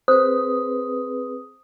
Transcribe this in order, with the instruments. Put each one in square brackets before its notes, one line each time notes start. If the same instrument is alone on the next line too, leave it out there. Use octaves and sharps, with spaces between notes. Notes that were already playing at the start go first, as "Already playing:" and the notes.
[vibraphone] C4 G#4 B4 [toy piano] C5 [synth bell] D#6